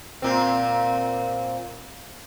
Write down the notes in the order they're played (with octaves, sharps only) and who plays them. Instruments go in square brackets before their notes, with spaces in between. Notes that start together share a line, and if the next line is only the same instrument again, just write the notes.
[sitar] A#2 C4